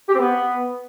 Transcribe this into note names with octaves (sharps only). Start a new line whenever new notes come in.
G4
C4
B3